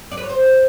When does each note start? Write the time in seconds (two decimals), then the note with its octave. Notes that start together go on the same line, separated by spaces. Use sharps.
0.12 D5
0.17 B4
0.23 C#5
0.29 C5